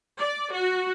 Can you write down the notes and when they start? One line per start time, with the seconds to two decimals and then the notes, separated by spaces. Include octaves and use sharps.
0.18 D5
0.51 F#4